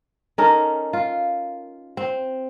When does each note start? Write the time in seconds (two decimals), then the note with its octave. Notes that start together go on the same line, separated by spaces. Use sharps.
0.38 C#4 D#4 A4 A#4
0.93 F4
1.97 C4